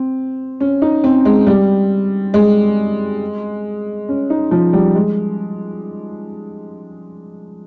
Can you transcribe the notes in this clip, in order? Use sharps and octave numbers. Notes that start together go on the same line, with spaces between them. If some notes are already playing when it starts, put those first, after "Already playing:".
Already playing: C4
C#4
D#4
C4
G#3
G3
G#3
C#4
D#4
F3
G3
G#3